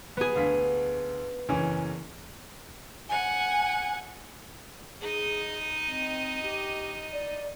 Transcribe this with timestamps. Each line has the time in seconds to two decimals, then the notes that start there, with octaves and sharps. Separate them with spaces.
0.17 B3 G#4
0.36 D2 F5 B6
1.49 F#1 E3 C#4
3.10 F#5 G#5
5.01 D#4 G#4 D#5
5.87 C4
6.42 G4
7.12 D5